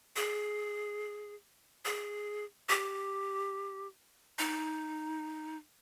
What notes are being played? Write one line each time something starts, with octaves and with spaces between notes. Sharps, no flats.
G#4
G#4
G4
D#4